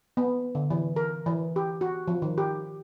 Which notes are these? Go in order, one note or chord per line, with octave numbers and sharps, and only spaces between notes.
B3
D3
E3
A#4
E3
G4
F#4
F3
D#3
G4